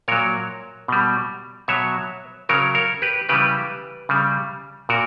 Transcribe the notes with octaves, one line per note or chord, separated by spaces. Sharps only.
A#2 F#3 A#4 C#5
B2 G3
B2 F#3 C#5 E5
C#3 F#3 A#4 C#5
A#4 C#5
G4 B4
C#3 E3 G3 G4 B4
C#3 G3
A#2 F#4 A#4